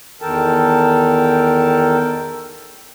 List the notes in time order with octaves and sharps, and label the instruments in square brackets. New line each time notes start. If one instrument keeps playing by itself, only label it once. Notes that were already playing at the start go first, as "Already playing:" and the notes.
[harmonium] E2 D#3 A4 A#4 G5 A5